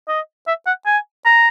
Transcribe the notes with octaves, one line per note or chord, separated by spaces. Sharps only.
D#5
E5
F#5
G#5
A#5